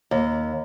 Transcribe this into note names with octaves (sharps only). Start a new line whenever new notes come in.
D#2